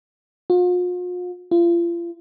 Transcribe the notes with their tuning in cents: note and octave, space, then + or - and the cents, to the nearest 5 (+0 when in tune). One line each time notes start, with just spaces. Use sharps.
F4 +45
F4 -35